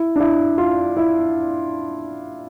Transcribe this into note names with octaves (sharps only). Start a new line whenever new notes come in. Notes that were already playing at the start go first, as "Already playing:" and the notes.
Already playing: E4
D4
E4
F4
E4